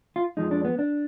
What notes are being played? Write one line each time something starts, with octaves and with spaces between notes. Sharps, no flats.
F4
F2 F3 G#3 D#4
D4
B3
D4